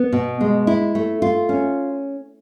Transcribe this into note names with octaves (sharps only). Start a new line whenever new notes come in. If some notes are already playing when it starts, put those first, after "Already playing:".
Already playing: B3
B2
G#3
E4
A3
F4
C#4